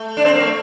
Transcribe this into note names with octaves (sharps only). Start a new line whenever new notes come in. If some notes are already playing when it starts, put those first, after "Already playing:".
Already playing: A3
D4
C4
A#3
A3